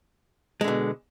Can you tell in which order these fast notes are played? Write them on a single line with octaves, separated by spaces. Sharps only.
G#3 D3 B2